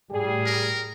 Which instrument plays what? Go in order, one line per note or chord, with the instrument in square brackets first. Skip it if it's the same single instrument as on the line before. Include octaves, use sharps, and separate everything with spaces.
[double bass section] A2 [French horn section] G3 G#4
[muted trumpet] A#4